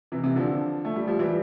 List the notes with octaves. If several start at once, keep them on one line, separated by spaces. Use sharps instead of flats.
C3 E3
C3 E3
D3 F3
A3
G3
F3
E3 G3